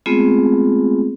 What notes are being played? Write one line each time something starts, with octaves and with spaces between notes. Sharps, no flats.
G#3 A3 B3 C4 F4 G#4